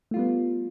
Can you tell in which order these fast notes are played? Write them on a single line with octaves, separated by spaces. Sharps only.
A3 F4 G3 B3